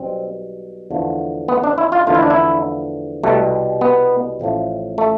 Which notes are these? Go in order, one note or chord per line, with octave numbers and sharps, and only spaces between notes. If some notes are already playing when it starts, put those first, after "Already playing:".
Already playing: B1 B2 G3 C4
E2 D3 F3 A3
B3
D4
E4
F4
E2 D3 F3 A3 F4
E4
D4
E4
C2 B2 G3 A3
B3
A1 A2 F3 A3
A3